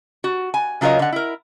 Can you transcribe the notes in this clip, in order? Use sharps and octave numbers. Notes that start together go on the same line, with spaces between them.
F#4
G#5
C#3 F#3 F4 A#4 C#5 D#5
D3 F#5
E4 A#4